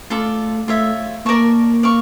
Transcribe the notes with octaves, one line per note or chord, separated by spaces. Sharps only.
A3 F4 A4 D5
A3 F4 C#5 E5
A#3 A#4 D5 A5 C#6
D5 F5 C#6